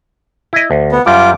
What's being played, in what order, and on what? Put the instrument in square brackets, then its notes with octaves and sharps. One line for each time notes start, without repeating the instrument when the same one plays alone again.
[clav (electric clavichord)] E4 D#5
D2
[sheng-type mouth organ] B3
[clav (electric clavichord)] F#2 G3 [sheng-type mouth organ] F4 D6